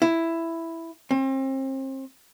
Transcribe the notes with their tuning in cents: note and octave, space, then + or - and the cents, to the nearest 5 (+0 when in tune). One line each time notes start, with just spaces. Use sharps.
E4 +5
C4 +35